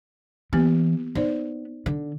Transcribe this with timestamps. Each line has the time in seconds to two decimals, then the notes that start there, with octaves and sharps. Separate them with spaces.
0.53 E3 A#3 B3 G4
1.15 B3 D#4 C5 D5
1.86 D3